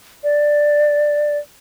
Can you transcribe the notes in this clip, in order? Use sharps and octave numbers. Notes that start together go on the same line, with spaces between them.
D5